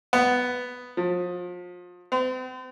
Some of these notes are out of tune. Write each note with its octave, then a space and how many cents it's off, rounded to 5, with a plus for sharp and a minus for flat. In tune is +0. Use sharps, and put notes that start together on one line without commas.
B3 +5
F3 +30
C4 -40